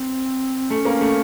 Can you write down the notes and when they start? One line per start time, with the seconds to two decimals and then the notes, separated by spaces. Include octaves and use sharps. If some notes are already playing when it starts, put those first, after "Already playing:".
Already playing: C4
0.70 A3 C#4
0.85 A#3
1.01 A3